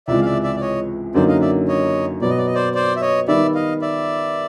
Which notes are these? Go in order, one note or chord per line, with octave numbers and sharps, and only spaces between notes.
C#2 C3 E3 G#3 D5 E5
F5
D5 E5
D5 E5
D5
C#5 D#5
F#2 D3 F#3 A#3 D#4 C5 D5
D#5 F5
D5 E5
C#5 D#5
B2 F#3 B3 D5
D#5
D5
D#5
C5 D5
C5 D5
E5
C#5 D#5
D#3 G3 B3 D#4 D5 E5
D#5 F5
D5 E5